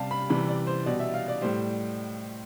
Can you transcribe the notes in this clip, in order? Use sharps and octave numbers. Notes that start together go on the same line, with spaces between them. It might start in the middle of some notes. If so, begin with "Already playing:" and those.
Already playing: C3 G3 F5 A5
B5
C3 E3 G3 B5
D5
C5
B2 G3 D5
E5
F5
D5
A2 G3 C5